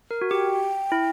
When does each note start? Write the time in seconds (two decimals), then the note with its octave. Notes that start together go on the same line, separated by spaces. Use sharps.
0.11 A#4
0.21 F#4
0.31 G4 G5
0.92 E4